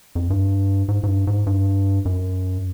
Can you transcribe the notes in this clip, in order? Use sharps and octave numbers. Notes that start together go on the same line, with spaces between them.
F2
G2
G#2
G#2
G2
G#2
G2
F#2